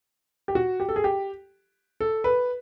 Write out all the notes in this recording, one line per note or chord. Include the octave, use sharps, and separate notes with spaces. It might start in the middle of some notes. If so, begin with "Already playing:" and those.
G4
F#4
G4
A4
G#4
G4
A4
B4